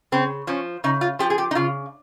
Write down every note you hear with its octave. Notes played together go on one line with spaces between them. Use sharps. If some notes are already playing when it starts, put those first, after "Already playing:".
C#3 C4
F3 C#4
C#3 D#4
F4
F3 G4
G#4
G4
D#4
C#3 F4